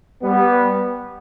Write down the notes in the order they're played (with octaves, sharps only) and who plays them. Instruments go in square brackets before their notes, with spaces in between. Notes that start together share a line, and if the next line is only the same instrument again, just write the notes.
[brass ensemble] G3 B3